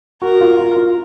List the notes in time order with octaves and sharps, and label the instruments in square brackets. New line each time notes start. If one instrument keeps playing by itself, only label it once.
[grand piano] F#4 [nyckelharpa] A#4
[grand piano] F4
F4
F4